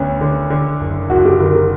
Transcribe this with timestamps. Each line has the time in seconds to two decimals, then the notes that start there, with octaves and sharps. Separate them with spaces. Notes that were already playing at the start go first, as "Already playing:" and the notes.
Already playing: D2 D3 B3 C#4
0.21 D3
0.50 D3
0.80 F#1
1.10 F#1 F#4
1.25 G4
1.40 D3 A#4
1.55 G4